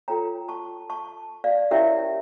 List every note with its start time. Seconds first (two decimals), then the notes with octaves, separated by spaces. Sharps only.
0.08 F4 A4 C#5 G5 A#5
0.48 A5 C#6
0.90 A5 C#6
1.44 D5 F5
1.71 C#4 E4 G4 A#4 C#5 E5 G5